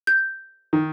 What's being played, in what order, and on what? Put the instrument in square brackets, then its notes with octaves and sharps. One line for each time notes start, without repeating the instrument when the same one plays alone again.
[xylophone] G6
[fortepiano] D#3